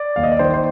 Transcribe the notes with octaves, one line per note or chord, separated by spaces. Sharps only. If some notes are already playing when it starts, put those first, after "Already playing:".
Already playing: D5
D#2 F5
D#5
D5
D#3 C5
C5